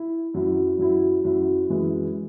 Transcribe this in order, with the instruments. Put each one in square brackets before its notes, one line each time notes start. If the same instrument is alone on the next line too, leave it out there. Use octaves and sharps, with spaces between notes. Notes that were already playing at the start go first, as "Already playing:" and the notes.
Already playing: [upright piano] E4
F#2 F#3 E4
F#2 F#3 E4
F#2 F#3 E4
F#2 E3 G#3 E4